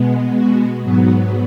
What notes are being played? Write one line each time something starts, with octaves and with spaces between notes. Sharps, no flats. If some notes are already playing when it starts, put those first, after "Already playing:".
Already playing: B2 G#3 B3
F#4
G#2 F#3 B3